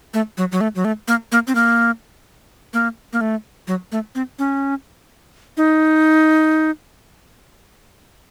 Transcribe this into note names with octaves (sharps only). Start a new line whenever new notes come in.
A3
F#3
F#3
A3
F#3
A3
A#3
A#3
C4
A#3
A#3
A#3
A3
F#3
A3
C4
C#4
D#4